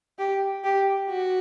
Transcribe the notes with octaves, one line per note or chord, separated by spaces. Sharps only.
G4
G4
F#4